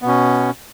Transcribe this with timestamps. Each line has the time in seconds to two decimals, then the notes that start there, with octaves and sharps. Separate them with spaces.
0.02 B3
0.05 B2
0.08 C#4